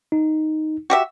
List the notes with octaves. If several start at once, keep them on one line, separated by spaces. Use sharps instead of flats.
D#4
F#4 G4 E5